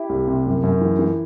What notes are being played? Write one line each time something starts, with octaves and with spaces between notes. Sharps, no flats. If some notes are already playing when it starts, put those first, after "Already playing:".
Already playing: E4 G4
C2
C3
F#2
F#2
E3
E3